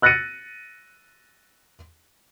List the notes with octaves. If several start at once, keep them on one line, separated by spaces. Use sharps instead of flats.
E6 F#6 A6 A#6 C#7 D#7